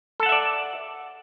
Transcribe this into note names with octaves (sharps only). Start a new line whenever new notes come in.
A4 D5 E5 F#5 A5